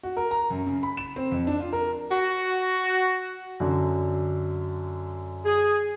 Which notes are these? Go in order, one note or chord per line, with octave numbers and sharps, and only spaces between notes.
F#4
A#4
A#5
F#2
C#3
B5
E7
C4
F2
D4
F4
A#4
F#4
F#2 D3
G#4